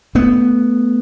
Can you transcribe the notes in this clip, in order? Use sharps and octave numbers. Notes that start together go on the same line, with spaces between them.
A3 B3